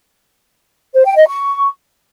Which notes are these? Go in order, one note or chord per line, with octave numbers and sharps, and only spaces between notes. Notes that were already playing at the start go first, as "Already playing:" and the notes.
C5
G5
D#5
C#6